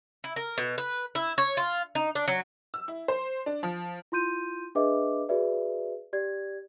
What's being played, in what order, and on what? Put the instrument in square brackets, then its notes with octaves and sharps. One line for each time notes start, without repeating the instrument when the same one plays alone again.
[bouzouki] E4
A#4
B2
B4
E4
C#5
F4
D#4
D4
F#3
[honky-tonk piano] E6
E4
C5
D4
F3
[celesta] E4 F4 C6 G6 D#7
D4 G#4 B4 D#5 E5 D6
F#4 G#4 B4 D5 E5
G4 D5 G#6